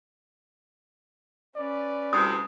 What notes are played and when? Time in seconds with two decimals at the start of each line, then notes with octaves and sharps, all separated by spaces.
1.56 C#4 B4 D5
2.13 D2 A2 C3 D#6